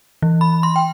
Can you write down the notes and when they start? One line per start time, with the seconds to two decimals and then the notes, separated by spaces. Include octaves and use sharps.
0.22 E3
0.41 B5
0.63 C6
0.76 G5